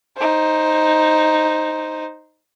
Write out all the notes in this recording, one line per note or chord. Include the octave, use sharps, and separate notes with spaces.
D#4 C5